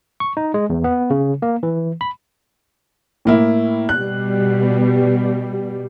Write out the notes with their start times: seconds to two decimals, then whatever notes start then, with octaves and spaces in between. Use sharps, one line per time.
0.20 C#6
0.37 D#4
0.54 G#3
0.70 E2
0.84 B3
1.10 C#3
1.42 A#3
1.63 E3
2.01 B5
3.25 A2 A#3 E4
3.89 B2 G3 F#6